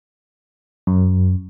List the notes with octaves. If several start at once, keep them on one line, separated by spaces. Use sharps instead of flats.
F#2